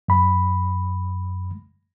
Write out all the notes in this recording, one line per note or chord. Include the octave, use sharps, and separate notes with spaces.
F#2 B5